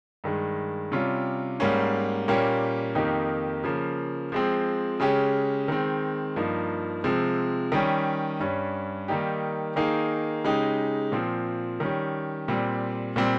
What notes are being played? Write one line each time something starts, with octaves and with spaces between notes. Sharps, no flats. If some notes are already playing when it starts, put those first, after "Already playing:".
G2 D#3 G#3
C3 G3 C#4 F4
G#2 G3 A#3 C#4
A#2 G3 A#3 C#4 G4
F2 D#3 A#3 D#4 G4
C#3 F3 A#3
F3 G#3 C4
C#3 G#3 C#4 G4
D#3 G#3 C4
G2 F3 A#3 D#4
C3 F3 G#3 C4
D#3 G3 C#4 G4
G2 G3 C#4
D#3 G3 A#3 D#4 G4
D#3 A#3 D#4 G#4
C#3 G#3 D#4 G4
A#2 F3 C4
D#3 G3 C#4 G4
A#2 G3 C4
A#2 G3 C4